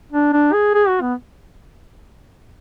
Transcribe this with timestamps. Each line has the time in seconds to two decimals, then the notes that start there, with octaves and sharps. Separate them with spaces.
0.12 D4
0.33 D4
0.53 G#4
0.74 G#4
0.88 F#4
1.01 B3